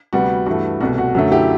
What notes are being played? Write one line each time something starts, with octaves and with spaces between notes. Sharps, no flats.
D2 C3 G3 B3 F#4
G2 E3 A3 F#4
C2 B2 A3 F#4
F#4
F#2 D3 F#3 A3 F#4
E4 G4